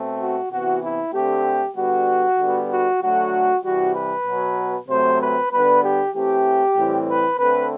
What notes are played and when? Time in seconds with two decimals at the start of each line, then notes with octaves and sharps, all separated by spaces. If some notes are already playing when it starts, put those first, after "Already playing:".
Already playing: B2 A3 C4
0.20 F#4
0.51 C3 E3 B3 F#4
0.82 E4
1.13 D3 A3 C4 G4
1.75 D3 G3 B3 F#4
2.38 D3 G3 B3
2.70 F#4
3.01 D3 F#3 A3 F#4
3.64 C3 E3 G3 F#4
3.94 B4
4.27 B2 F#3 B3
4.89 C3 F#3 A3 C4 C5
5.20 B4
5.51 D3 G3 B3 B4
5.83 G4
6.14 E3 A3 C4 G4
6.76 A2 E3 G3 C4
7.08 B4
7.39 D3 A3 C4 B4